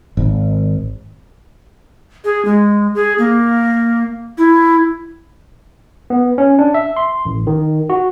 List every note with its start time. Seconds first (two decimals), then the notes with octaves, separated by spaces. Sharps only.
0.17 G#1
2.24 G#4
2.45 G#3
2.95 G#4
3.18 A#3
4.38 E4
6.10 B3
6.38 C#4
6.59 D4
6.74 E5
6.97 C6
7.25 A1
7.47 D#3
7.90 F#4